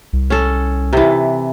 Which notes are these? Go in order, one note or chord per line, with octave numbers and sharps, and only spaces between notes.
C2
C#4 A4
C3 E3